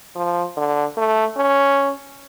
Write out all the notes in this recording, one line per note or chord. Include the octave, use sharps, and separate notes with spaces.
F3
D3
A3
C#4